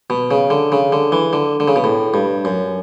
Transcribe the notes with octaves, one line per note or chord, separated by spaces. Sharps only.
B2
C#3
D3
C#3
D3
E3
D3
D3
C#3
B2
A2
G2
F#2